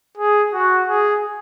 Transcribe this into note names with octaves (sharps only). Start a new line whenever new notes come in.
G#4
F#4
G#4